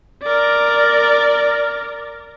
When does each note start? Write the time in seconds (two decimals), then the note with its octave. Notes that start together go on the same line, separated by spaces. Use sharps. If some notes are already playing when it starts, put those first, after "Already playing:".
0.23 A#4 D5